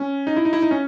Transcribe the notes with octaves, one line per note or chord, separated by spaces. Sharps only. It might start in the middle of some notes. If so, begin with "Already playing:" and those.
Already playing: C#4
D#4
E4
D#4
E4
D#4
C#4